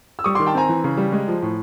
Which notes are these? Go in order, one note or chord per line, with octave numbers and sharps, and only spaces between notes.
E6
G3 C#6 D#6
D#3 C6 D6
G5 A5
C4 G#5 A#5
E3
C#3
G3
G#3
F3
A2